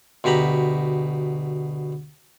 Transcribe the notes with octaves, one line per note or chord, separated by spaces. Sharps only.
D2 B2 G4 A#5 B5